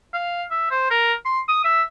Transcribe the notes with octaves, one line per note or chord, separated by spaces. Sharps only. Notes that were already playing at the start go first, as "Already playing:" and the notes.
F5
E5
C5
A#4
C6
D#6
E5